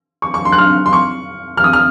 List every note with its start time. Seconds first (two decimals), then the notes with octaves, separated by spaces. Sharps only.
0.22 C#6
0.34 C#6
0.45 C6
0.52 F#6
0.58 F6
0.86 C6
0.93 C#6
1.57 F6
1.64 D#6
1.73 F6